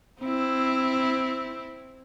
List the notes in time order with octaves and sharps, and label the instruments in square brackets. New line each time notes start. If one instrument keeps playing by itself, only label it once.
[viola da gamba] C4 E4